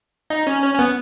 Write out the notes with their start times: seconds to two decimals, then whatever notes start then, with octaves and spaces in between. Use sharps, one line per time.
0.30 D#4
0.47 C#4
0.63 C#4
0.74 C#4
0.79 B3